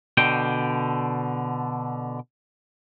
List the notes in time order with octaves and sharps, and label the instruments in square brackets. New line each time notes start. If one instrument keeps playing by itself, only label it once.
[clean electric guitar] B2 D3 G5